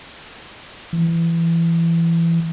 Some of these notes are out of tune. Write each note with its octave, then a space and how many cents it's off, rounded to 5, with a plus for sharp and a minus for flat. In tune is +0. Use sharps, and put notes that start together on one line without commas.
E3 +20